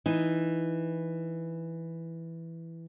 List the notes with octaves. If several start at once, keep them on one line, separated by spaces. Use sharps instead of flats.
E3 D#4